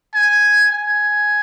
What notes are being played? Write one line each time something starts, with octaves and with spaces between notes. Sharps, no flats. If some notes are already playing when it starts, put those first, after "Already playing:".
G#5
G#5